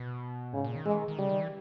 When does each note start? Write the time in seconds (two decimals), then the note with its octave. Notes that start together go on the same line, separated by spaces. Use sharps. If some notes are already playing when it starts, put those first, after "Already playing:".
Already playing: B2
0.53 G#2 C#3
0.64 A#2
0.75 D#3
0.86 E3 G#3
0.97 D#3
1.08 D#3
1.19 C#3 G3
1.29 D#3
1.41 E3